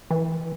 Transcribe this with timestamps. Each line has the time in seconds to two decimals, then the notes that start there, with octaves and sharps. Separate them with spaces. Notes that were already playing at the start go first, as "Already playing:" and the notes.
0.11 E3